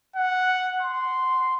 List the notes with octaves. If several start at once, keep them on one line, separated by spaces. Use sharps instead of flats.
F#5
C6